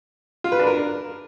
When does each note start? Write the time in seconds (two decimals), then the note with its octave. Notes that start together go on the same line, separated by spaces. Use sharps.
0.44 F4
0.52 B4
0.59 D4
0.67 A#4